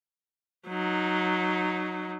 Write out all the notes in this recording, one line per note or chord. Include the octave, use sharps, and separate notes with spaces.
F#3 D#4